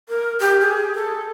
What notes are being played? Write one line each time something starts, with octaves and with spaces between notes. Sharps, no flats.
A#4
G4
G#4
A4